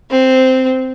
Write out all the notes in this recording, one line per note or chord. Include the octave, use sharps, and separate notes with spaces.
C4